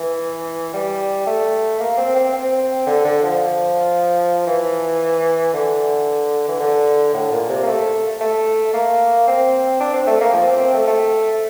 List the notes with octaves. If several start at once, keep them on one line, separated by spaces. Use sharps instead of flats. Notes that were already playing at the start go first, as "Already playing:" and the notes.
Already playing: E3
G3
A3
A#3
C4
C4
C4
D3
D3
F3
E3
D3
E3
D3
A2
A#2
C3
A#3
A3
A3
A#3
C4
D4
C4
A3
A#3
F3
C4
C4
A3
A3